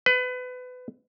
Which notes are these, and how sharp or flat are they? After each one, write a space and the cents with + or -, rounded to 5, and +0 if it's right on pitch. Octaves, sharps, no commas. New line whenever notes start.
B4 +25